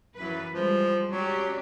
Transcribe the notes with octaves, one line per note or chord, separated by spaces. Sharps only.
F#2 E3 B4
F3 G3 G#3
F#3 C#4 G4 D5